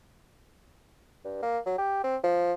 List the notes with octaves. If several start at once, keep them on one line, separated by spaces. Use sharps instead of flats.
G2
A#3
F#3
G4
C4
F3